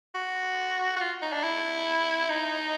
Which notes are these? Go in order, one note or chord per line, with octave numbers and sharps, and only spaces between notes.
F#4
F#4
F4
D#4
D4
E4
D#4